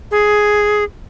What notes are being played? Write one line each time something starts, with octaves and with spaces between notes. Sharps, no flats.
G#4